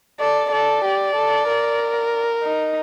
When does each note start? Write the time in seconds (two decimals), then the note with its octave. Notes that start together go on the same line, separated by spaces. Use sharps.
0.20 A4 D5
0.52 A4 D5
0.85 G4
1.16 A4
1.48 A#4
2.43 D#4